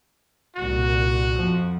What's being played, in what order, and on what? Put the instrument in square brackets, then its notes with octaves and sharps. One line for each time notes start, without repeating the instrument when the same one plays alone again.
[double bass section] C2 A#2 [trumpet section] F#4
[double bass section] F2 F3